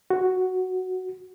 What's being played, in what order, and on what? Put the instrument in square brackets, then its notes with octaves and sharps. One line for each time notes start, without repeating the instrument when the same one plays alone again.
[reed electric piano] F#4